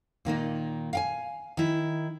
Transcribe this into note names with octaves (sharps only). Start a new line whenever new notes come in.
A#2 D#3 A#3 D#4
F5 G5 G#5
D#3 E4